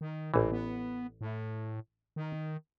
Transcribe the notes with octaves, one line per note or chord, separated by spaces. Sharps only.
D#3
A1 A#2 E3
B3
A2
D#3